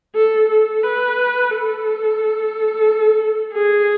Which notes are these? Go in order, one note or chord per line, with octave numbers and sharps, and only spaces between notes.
A4
A4
B4
A4
G#4